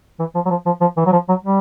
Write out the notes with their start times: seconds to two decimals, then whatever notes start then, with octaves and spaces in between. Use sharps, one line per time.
0.19 E3
0.35 F3
0.46 F#3
0.50 F3
0.66 F3
0.81 F3
0.97 E3
1.06 F#3
1.12 F3
1.29 F#3
1.44 G3